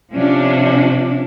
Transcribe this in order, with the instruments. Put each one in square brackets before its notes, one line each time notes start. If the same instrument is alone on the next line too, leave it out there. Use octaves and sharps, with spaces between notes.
[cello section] C3 F3 C#4 D4